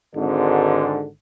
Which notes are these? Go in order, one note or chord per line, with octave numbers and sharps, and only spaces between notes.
G#1 G#2 D3